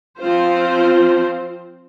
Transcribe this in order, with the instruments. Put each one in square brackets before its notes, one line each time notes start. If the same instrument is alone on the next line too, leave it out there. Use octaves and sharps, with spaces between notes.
[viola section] F3 C4 F4 C5